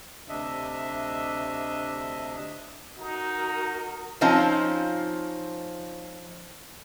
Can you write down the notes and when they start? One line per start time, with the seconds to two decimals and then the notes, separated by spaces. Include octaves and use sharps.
0.29 D2 C3 D4 D#5 E5
3.00 D#4 F#4 A#4
4.21 F3 C4 C#4 D#4 F4